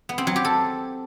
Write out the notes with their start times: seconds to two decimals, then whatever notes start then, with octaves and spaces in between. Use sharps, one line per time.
0.09 B3
0.18 C4
0.27 F#3
0.36 G4
0.45 A4